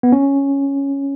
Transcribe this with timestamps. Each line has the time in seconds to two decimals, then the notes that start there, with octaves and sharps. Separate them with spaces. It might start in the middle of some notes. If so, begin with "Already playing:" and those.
0.03 B3
0.12 C#4